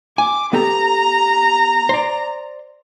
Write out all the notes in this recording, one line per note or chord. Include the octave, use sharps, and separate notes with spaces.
G#5 D6
B3 G4 A4 A#5
C5 D5